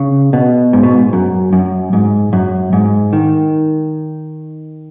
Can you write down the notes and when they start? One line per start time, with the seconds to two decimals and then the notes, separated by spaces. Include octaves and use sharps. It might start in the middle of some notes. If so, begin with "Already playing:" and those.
Already playing: C#3
0.33 B2
0.73 G#2
0.83 B2
0.94 G#2
1.13 F#2
1.53 F#2
1.93 G#2
2.33 F#2
2.73 G#2
3.13 D#3